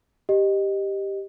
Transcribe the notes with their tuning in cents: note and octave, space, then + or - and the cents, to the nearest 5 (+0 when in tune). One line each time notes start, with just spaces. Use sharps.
G4 +0 D#5 -10